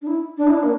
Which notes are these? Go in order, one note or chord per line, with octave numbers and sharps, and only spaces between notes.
D4
E4
D4
E4
D4
A#3